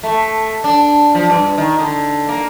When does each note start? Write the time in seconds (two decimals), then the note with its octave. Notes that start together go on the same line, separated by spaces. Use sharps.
0.03 A3
0.64 D4
1.15 F3
1.30 G2
1.58 D#3
1.79 D3
2.29 A#3